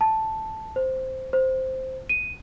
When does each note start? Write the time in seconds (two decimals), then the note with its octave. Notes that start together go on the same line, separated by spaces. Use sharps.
0.01 A5
0.76 C5
1.33 C5
2.09 D#7